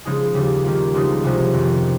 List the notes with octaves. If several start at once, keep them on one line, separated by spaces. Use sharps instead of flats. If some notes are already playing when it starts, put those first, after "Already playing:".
C#3 F3 G#3 D#4 G#4
D#2 C#3 G3
D#3 G3 A#3 F4
C#2 C#3 F3 G#3 D#4
C2 C3 F3 G#3 C#4
F2 D#3 A#3